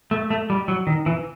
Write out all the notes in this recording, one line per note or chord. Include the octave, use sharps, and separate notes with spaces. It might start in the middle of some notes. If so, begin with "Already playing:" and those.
A3
A3
G3
F#3
D#3
E3